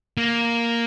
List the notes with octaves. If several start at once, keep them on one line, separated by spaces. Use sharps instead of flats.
A#3